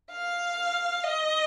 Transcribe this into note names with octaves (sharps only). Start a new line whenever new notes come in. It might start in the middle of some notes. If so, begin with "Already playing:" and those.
F5
D#5